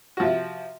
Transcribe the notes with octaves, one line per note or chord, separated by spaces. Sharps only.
C3 F3 F#4